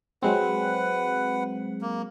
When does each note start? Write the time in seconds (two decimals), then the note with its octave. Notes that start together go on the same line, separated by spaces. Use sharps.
0.22 F#3 G#3 C4 B4 F#5
1.81 A#3